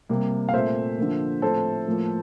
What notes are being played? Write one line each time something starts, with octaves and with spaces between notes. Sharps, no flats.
C3 G3 A#3
F5
A#2 A3 C4 C5 E5
D3 F3 A#3
A2 F3 C4 A4 C5
A2 F3 A#3